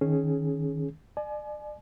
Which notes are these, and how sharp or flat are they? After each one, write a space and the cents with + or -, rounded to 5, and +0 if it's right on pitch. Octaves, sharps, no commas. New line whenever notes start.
D#3 +0 C#4 +0 G#4 +15
D5 +35 G#5 +35